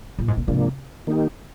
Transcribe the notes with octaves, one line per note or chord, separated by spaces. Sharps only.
A#2
G#2
A#2
G#2 C3 F3 A#3 D4
D#3 A#3 D#4 G4